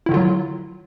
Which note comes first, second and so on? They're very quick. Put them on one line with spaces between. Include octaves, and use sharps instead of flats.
E4 D#3 D3 F4 F#3